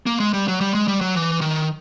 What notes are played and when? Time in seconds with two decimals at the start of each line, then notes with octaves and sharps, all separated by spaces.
0.06 A#3
0.20 G#3
0.33 G3
0.48 F#3
0.61 G3
0.74 G#3
0.88 G3
1.01 F#3
1.15 E3
1.41 D#3